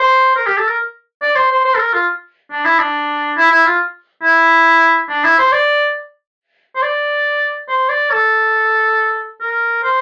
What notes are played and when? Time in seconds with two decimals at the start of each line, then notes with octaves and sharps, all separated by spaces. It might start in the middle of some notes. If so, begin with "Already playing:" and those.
Already playing: C5
0.36 A#4
0.46 G4
0.57 A4
0.68 A#4
1.22 D5
1.36 C5
1.51 C5
1.65 C5
1.75 A4
1.79 A#4
1.93 F4
2.51 D4
2.65 E4
2.79 D4
3.37 E4
3.51 E4
3.66 F4
4.23 E4
5.09 D4
5.24 E4
5.38 C5
5.52 D5
6.75 C5
6.82 D5
7.68 C5
7.89 D5
8.11 A4
9.41 A#4
9.83 C5